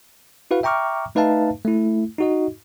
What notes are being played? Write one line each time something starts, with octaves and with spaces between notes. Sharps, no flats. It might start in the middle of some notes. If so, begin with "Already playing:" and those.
E4 F#4 B4 F5
E5 G5 A#5 C#6 D6 F6
A3 D#4 B4 E5 F5 A5
A3 E4
D#4 F#4 D#5